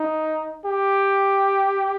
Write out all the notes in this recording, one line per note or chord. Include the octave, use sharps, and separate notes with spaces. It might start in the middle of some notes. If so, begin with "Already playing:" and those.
Already playing: D#4
G4